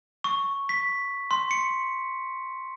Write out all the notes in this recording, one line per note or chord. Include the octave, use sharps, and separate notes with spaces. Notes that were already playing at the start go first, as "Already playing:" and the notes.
C#6
B6
C6
C#7